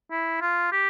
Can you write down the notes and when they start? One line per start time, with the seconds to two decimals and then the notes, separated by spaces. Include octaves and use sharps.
0.11 E4
0.41 F4
0.72 G4